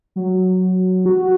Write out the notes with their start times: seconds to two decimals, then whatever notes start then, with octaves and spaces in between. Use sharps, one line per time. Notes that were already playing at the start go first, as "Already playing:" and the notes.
0.16 F#3
1.06 F#4